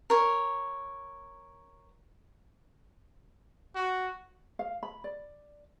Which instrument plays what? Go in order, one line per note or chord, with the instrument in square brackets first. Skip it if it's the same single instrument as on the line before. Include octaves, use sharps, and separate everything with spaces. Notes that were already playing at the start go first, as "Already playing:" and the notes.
[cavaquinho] A#4 C#5
[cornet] F#4
[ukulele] F5
B5
D5